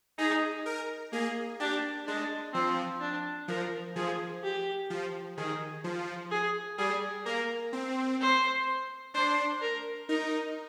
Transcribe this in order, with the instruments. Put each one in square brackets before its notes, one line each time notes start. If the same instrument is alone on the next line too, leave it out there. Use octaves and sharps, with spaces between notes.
[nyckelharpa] D#4 [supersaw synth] G#4
[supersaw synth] A#4
[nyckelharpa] A#3 [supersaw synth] G#4
[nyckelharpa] D4 [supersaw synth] G4
[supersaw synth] G#3 [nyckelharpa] D4
[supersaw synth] F3 [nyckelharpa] C4
[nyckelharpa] D4
[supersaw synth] F3 [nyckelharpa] A#4
[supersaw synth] F3 [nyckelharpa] G#4
[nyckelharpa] G4
[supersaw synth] F3
[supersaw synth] D#3 [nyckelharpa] G#4
[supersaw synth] F3
[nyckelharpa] G#4
[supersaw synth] G3 [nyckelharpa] G#4
[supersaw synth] A#3 [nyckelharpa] A#4
[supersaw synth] C4
[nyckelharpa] C5
[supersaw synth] D4 [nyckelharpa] C5
[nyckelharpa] A#4
[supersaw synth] D#4 [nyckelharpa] A#4